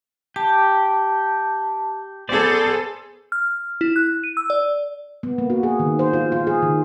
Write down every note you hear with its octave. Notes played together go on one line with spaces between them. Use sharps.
G4 A5
B3 G#4 A4 C5 D5
F6
E4
F#6
D#7
E6
D5
B3
A#3
F#4
G#4
D#3
C5
F4
F4
G#4
D#3